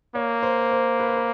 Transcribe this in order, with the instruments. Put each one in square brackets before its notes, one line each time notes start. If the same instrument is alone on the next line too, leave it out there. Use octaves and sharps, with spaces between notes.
[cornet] A#3 [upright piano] C#5
[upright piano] C5
C5
B4
C5
B4